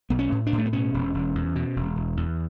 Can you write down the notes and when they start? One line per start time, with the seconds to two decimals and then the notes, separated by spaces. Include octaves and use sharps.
0.10 B1 B3
0.19 C#4
0.32 A2
0.46 D4
0.52 A2
0.58 A3
0.66 B3
0.73 B2 C#4
0.94 E1
1.14 E1
1.35 E2
1.56 B2
1.76 E1
1.96 E1
2.17 E2